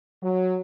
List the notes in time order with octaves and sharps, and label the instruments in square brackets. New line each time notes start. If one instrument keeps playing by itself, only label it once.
[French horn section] F#3